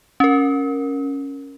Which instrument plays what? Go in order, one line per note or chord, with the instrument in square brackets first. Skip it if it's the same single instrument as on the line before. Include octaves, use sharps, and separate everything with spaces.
[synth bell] C#4 A#4